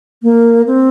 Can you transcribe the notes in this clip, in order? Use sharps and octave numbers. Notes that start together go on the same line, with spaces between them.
A#3
C4